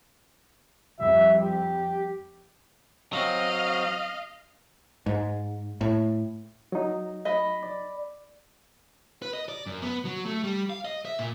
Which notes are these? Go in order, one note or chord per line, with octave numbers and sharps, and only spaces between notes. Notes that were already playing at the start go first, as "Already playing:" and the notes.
F2 G3 E5
G4
F#3 C4 D#5 F5
G#2
A2
F#3 D#4
D#5 B5
D5
B4
D#5
D5
F#2
B3
F#3
A3
G3
F5
D#5
E5
A#2